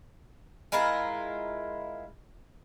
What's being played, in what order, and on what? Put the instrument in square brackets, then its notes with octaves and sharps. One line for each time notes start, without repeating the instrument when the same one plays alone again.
[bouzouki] G#3 E4 F4 A#4